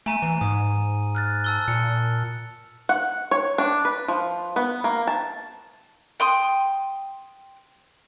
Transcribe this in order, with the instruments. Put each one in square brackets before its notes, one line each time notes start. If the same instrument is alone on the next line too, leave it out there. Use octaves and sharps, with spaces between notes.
[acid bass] A3 [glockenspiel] G#5 A#5 D#7
[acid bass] E3
[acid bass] G#2 [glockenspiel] D#6
[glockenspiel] F6 F#6 A6
A5 E6 G7
[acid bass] A#2 [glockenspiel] C#7
[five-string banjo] F#5
C#5
D4
B4
F3
B3
A#3
A5
[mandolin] G5 C6 D#6